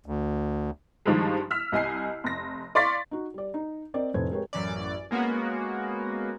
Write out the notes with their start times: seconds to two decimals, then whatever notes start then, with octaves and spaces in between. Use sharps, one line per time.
0.06 D2
1.06 G2 D#3 F3 G3 G#3
1.51 E6 F6 B6
1.72 C2 D#5 G#5 C7
2.24 F1 A#6
2.75 D5 F5 C6 C#6 A6 B6
3.11 D#4 F#4
3.34 G3 D5
3.54 D#4
3.94 C4 A#4 D5 D#5
4.14 F1 A2 B4 C5 G#6
4.31 G#3 G4 A#4 B4 C#5
4.53 A1 F#2 E3 C#4 D5
5.11 G#3 A#3 B3 C#4 F#4